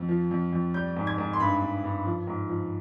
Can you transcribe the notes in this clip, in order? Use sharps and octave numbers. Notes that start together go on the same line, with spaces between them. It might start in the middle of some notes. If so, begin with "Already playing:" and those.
Already playing: F2
F3
F2
F2
G3 G6
G#2
G#6
G#2
C6
G2 B5
G2
G2
F3
G#2
F3